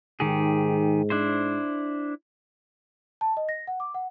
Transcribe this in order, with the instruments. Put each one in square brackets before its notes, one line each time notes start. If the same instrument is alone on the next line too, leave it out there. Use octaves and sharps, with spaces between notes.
[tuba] G#2 [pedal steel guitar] D#3 G4 G#4
[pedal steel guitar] D4 E4 C5
[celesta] A5
D#5
A#6
F#5
D6
F#5